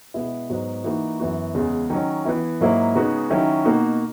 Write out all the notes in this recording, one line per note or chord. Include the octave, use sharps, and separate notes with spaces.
B2 G#3 B3 E4
G#2 F#3 B3 F#4
E3 A#3 D#4 F#4
F#2 E3 B3 F#4
E2 C#3 G#3
D#3 F#3 C#4
E3 B3 E4
G#2 F#3 A#3 E4
C#3 G#3 B3 D#4 F#4
D#3 F#3 C#4 E4
B2 A#3 D#4 F#4